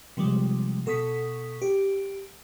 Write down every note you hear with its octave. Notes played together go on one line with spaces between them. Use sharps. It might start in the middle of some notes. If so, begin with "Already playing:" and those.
C3 F3 G3 G#3
B2 A4 C#6 D#6 B6
G4